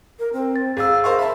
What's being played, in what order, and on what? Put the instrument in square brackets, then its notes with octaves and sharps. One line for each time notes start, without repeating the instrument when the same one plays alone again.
[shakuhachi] A#4
C4
[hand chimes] A6
[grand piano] G#1 [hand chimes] G#4 E6 [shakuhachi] F5
[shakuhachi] A#4 [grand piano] C5 F5 C#6
[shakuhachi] E5 [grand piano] A5 B5